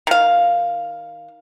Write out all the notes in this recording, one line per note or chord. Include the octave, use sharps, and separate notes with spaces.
D#3 F5